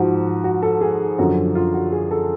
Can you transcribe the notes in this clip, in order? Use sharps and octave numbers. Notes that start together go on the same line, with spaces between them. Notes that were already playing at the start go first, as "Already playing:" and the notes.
Already playing: G#2 F3 F#4
F#4
A4
G#4
F#2 D3 F3 F#4
F4
F#4
G#4
A4